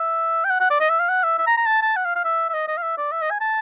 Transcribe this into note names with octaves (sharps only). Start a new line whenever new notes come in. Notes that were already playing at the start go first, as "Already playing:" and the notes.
Already playing: E5
G5
F#5
F#5
D5
D#5
E5
F5
F#5
E5
E5
A#5
A#5
A5
A5
F#5
F5
F5
E5
E5
D#5
D#5
F5
E5
D5
E5
D#5
G#5
A5